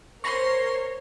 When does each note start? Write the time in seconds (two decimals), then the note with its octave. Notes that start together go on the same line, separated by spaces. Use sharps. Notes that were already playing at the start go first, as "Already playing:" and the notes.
0.24 A#4 C5 C#5 C6 C#6 A#6